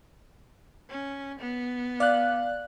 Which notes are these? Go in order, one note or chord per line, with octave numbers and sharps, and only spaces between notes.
C#4
B3
D5 F5 F#6